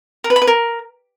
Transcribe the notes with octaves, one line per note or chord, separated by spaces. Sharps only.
A#4
B4
B5
B4
A#4